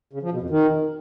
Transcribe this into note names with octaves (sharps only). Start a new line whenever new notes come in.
C#3
F3
B2
F2
D#3